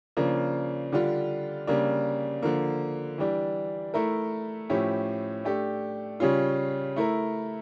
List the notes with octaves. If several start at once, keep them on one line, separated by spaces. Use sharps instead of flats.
C#3 F3 A#3 D4
D3 G3 D4 F4
C#3 G3 A#3 D4
D3 F3 A#3
E3 G3 D4
A3 E4 A#4
A2 F3 C#4 E4 G4
A3 D4 G4
C#3 G3 C#4 F4
A3 E4 A#4